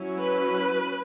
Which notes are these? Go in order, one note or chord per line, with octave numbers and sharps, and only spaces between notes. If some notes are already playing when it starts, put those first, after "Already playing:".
Already playing: F#3 C#4 E4
B4